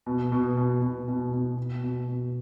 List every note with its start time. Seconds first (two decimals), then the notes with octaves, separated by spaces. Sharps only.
0.06 B2
0.32 B2
0.57 B2
0.82 B2
1.08 B2
1.33 B2
1.57 B2
1.83 B2
2.08 B2